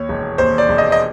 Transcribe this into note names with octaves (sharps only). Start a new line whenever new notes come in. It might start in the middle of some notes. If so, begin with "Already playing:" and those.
Already playing: D#2 C#5
E1
D#2 C5
D5
E1
D#5
D#5